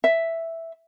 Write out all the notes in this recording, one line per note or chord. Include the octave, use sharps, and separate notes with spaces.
E5